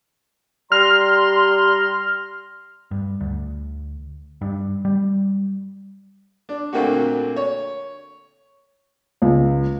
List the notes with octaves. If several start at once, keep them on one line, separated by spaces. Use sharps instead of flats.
G3 A#5 C6 F6
G2
D2
G2
G3
D4
A#2 D3 A3 A#3 C4 F#4
C#5
C#2